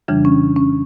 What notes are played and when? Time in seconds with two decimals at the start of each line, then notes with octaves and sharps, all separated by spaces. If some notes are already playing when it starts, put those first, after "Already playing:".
0.08 F2 C#3 E3 G3 D4
0.25 C#4
0.56 C#4